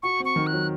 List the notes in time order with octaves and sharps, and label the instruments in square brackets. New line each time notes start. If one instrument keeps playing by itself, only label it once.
[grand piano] F#4 [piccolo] C#6
[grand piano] C4
[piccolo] C#6
[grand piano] D#3
[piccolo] F#6
[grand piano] F#3